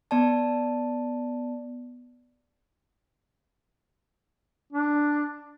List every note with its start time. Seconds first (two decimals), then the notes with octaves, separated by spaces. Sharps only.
0.11 B3 D5 A5
4.72 D4